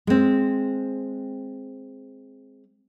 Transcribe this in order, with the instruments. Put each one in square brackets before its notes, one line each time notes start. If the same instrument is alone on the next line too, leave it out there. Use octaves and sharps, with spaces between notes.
[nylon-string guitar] G#3 C4